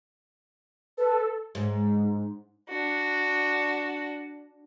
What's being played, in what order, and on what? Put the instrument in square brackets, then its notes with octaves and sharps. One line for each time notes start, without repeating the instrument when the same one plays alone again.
[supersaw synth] A4 [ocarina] B4
[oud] G#2
[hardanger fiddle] D4 F#4